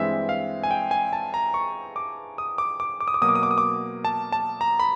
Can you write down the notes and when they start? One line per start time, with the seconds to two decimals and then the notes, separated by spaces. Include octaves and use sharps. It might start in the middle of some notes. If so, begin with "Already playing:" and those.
Already playing: G2 E3 G#3 C4 E5
0.29 F5
0.63 G#5
0.71 G5
0.91 G#5
1.13 A5
1.34 A#5
1.54 C#6
1.96 D6
2.38 D#6
2.58 D6
2.80 D6
3.00 D6
3.08 D#6
3.14 D6
3.21 B2 F#3 A#3 D#6
3.28 D6
3.35 D#6
3.43 D6
3.51 D#6
3.58 D6
4.05 A5
4.32 A5
4.61 A#5
4.80 B5